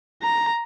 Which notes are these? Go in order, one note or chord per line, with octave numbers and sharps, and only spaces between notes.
A#5